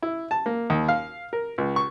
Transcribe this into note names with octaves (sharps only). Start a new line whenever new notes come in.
E4
A5
A#3
D#2
F5
A#4
C#2
C#6